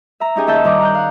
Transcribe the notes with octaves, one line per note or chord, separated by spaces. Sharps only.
E5 A#5
C#4 D#4 G4 G#4 G#5
D#2 C#5 D#5 E5 A5 G6
G2 D#3 D#4 A#5 D6
A#5 F#6 G6
F5 F#5